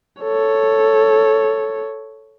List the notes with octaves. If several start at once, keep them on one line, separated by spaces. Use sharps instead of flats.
A4 C#5